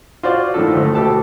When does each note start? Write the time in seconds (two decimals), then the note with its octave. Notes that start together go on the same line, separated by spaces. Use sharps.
0.23 F4 F#4 C5 D5
0.54 A2 D#3 F3 A4
0.75 D2 A3
0.95 B2 G4 A4 A5